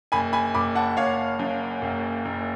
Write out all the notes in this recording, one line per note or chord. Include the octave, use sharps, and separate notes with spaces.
F#1 G#5 B5
G#5 B5
F#1 B5 D6
F#5 A5
F#1 C#5 F5
F#2
F#1
F#1